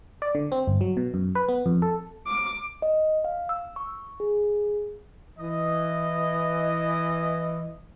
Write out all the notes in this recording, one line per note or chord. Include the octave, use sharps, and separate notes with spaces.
D5
D3
C4
G1
F#3
B2
F#2
B4
B3
F2
A4
D6
D#5
F5
E6
C#6
G#4
E3 D#5